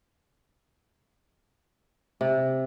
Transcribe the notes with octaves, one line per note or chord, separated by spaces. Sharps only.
C3